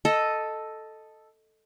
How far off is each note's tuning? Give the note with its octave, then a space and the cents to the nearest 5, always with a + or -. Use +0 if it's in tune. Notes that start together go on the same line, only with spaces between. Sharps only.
A4 +0 D#5 +0